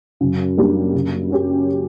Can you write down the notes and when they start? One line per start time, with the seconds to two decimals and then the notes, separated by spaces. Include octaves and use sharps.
0.21 F#2 C#3
0.58 G3 A#3 D4 G4
0.94 C#3
1.30 F#3 C#4 G4